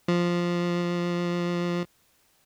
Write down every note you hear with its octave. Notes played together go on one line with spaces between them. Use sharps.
F3